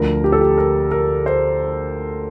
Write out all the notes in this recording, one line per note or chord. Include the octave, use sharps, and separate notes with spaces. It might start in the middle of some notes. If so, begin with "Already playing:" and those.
Already playing: D2 D3 F3 A#4
G4
A4
G4
A#4
A#4
C5